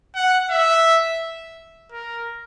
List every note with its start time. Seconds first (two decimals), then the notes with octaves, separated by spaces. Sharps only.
0.15 F#5
0.50 E5
1.92 A#4